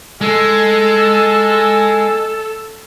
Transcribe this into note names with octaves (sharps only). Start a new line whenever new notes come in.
G#3 A4